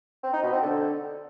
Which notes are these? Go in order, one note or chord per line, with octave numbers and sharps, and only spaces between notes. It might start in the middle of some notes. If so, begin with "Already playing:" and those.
C4
D#4
B2
C4
D3